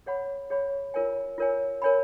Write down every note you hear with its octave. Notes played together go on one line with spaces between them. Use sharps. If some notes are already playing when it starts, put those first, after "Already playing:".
G#4 C#5 F#5 B5
G#4 C#5 F#5 B5
F4 A#4 C#5 G#5
F4 A#4 C#5 G#5
A#4 C#5 G#5 B5